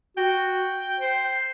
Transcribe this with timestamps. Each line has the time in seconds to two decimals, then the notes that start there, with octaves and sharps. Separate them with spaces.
0.17 F#4 G5
1.00 C5